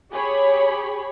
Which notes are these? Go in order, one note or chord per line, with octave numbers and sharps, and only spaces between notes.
G4 G#4 C#5 B5